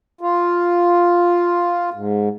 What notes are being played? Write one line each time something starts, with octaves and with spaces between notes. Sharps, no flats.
F4
G#2